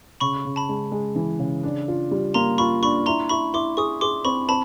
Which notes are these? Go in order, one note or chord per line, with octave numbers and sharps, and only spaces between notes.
C#3 B5 C#6
C#3
A5 B5
G#3
G#3
E3
C#3
D4
F4
G3
A#3 A#5 C6
F4 B5 C#6
D4 B5 C#6
E4 A#5 C6
E4 B5 C#6
E4 C6 D6
G#4 C#6 D#6
G#4 C6 D6
C4 B5 C#6
C4 A5 B5